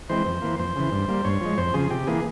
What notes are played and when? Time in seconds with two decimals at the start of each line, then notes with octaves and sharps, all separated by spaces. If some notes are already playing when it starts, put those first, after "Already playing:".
0.09 E3 G#3 C4 C5
0.26 F2
0.42 E3 A#3
0.59 F2 C5
0.76 C#3 E3
0.92 G2
1.08 G3 A#3
1.25 G2 C#5
1.41 F3 G#3
1.58 F2 C5
1.74 C#3 F3 G#4
1.90 C3 G4
2.07 E3 A#3 G#4